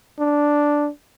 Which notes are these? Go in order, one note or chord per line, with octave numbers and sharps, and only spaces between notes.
D4